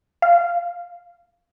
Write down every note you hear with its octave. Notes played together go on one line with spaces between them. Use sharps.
F5